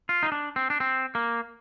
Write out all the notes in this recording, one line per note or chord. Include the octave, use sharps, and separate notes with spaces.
F4
D#4
D4
C4
D4
C4
A#3